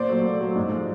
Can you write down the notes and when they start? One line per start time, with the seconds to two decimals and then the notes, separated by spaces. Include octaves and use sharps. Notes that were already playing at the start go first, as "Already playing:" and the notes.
Already playing: A#2 C5 D5
0.09 F#3 A3
0.24 A#2
0.41 F#3 A3
0.56 G#2
0.72 F3 G#3